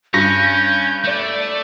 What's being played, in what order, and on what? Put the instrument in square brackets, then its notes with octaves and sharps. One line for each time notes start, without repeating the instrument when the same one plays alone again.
[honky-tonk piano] G2 A#6 [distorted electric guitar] C#4 [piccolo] G6
[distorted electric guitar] A3 [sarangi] D5